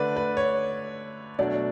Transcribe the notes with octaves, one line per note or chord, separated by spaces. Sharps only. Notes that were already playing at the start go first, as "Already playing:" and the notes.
Already playing: D3 A3 D4 B4 D5
B4
C#5
B2 F#3 A3 D4 D5